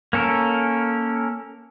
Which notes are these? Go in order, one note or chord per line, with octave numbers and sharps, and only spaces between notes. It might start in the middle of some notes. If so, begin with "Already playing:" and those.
A#3 C#4 A4 A#4